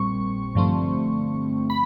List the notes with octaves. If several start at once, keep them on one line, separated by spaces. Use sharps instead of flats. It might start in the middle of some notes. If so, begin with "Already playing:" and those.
Already playing: A#1 A#2 G3 C4 C#6
G2 D3 F3 A3 C4
B5